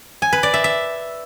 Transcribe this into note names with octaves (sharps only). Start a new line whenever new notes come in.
G#5
B4
D5
E5
E5